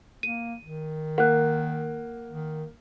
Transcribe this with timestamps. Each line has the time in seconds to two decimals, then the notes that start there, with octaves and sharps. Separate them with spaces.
0.23 A#3 D#7
0.63 D#3
1.18 A#3 F#5 F#6
2.31 D#3